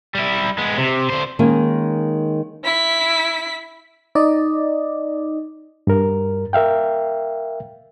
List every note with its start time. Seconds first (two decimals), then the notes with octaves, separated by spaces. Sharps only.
0.15 G3 E4
0.58 G#3 B3
0.78 C3
1.10 D3 C5
1.39 D#3 G#3 A#3 C#4
2.64 E4 B6
4.15 D#4 D5 D#5
5.87 G2 A#4
6.53 A#4 E5 F5 G5